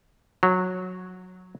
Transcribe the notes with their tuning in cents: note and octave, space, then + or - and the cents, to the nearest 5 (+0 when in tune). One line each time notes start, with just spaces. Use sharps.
F#3 -15